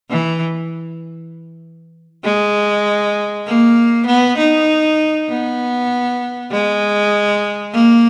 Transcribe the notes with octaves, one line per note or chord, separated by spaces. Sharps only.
E3
G#3
A#3
B3
D#4
B3
G#3
A#3